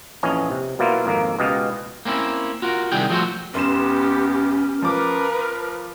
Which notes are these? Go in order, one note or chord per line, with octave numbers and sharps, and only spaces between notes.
A#1 F2 E3 C#4 D#5 G#5
C3
B2 F#3 A#3 E4 F4
G#1 F2 A#3
C#2 B2 G4 D#5 F5
A#3 C4 C#4 E4
F4 F#4 A#4
C2 C3 D#3 G3 G#4 G5
F3 F#3 A3 F#4 C5
F1 B3 C#4 G4 C6 E7
F3 A#4 B4 D6